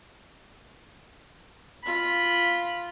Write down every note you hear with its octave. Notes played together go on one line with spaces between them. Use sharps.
F4 B5